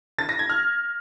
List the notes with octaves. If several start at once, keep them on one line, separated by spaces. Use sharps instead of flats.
A6
A#6
G#6
F6